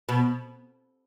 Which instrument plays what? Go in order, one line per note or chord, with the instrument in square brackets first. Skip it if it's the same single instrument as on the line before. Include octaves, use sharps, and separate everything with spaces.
[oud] B2